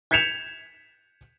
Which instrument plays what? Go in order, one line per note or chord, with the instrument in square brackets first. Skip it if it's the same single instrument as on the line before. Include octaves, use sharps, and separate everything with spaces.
[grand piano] G6 G#6 B6 C#7 E7 F7